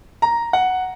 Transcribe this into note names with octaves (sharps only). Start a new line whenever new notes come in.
A#5
F#5